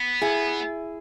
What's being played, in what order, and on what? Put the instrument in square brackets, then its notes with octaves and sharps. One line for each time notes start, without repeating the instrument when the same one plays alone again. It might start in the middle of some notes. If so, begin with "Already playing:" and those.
Already playing: [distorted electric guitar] B3
[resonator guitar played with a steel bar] E4 G#4